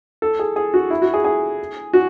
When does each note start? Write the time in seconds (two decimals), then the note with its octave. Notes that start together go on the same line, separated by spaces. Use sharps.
0.22 A4
0.39 G#4
0.56 G#4
0.74 F#4
0.90 E4
1.02 F#4
1.14 G#4
1.24 G#4
1.93 F#4